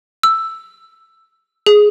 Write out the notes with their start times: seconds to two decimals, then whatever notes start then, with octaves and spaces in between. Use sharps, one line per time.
0.23 E6
1.66 G#4